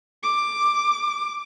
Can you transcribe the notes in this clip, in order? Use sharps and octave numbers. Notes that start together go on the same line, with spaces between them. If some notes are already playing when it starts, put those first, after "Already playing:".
D6